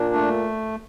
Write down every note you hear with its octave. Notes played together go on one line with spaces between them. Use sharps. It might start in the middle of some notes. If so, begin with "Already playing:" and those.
Already playing: A#2 D4
A3